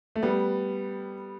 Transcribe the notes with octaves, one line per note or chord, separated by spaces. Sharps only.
A3
G3 B3